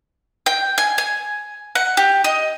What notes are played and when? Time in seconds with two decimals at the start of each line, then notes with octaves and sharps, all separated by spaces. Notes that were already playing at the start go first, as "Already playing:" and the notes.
0.46 G5
0.78 G#5
0.98 G#5
1.75 F#5
1.97 G4
2.24 D#5